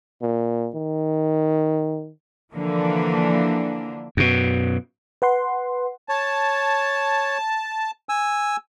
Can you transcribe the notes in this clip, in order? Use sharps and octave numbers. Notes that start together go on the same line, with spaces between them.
A#2
D#3
D3 E3 F3 A#3 D4
F#2 B2
B4 F#5 C6
C#5 A5
G#5 E6